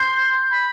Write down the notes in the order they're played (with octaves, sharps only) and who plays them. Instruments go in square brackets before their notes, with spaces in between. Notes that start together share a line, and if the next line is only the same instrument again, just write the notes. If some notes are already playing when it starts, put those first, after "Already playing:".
Already playing: [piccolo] C6 [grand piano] G6
[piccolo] B5